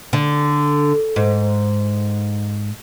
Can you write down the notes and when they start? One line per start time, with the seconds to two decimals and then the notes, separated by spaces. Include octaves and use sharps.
0.13 D3
1.16 G#2